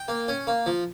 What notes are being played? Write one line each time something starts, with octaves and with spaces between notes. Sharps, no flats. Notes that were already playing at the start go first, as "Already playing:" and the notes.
Already playing: G5
A#3
C#4
A#3
F3